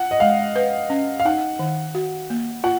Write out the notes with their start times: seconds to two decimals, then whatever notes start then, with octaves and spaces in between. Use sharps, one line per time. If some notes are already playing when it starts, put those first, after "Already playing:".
Already playing: F4 F#5
0.11 D#5
0.20 G#3 F5
0.56 B4
0.90 C#4
1.20 F5
1.25 D#4 F#5
1.59 D#3
1.95 F#4
2.30 A#3
2.64 F4 F#5